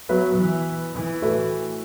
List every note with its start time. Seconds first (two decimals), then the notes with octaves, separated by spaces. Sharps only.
0.08 F#3 B3 F#4 B4 E5
0.37 E3
0.94 E3
1.22 A2 A3 F#4 B4 E5